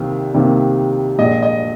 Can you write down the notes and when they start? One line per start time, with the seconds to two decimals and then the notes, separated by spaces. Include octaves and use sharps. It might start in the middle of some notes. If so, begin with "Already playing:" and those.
Already playing: C2 C3 D#3 A#3
0.34 C2 C3 D#3 A#3
1.18 A#1 A#2 G#3 D#5
1.43 D#5